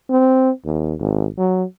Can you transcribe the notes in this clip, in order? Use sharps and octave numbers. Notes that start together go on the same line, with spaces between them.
C4
D#2
G#1
F#3